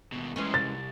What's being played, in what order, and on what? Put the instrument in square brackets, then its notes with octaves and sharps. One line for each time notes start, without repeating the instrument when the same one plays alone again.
[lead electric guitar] D#2 B2
[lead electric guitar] F#2 C5 [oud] E3 G#3 C#4
[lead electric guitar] C2 [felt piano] A6